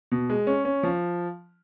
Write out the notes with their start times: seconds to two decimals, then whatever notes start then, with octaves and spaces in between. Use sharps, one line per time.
0.12 B2
0.30 G#3
0.47 C#4
0.65 C#4
0.83 F3